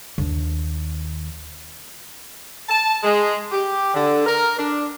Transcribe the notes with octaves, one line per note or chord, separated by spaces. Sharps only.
D#2 D4
A5
G#3
G4
D3
A#4
D4